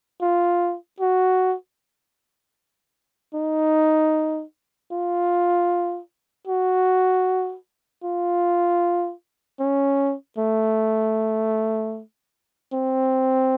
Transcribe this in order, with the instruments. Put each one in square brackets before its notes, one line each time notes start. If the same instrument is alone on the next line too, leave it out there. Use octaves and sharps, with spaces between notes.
[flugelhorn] F4
F#4
D#4
F4
F#4
F4
C#4
A3
C4